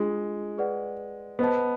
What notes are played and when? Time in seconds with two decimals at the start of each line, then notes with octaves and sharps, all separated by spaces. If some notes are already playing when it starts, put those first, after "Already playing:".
Already playing: G#3 D4 F4 G#4
0.58 G#4 B4 D5 F#5
1.39 B3 C5 D#5 F#5 A5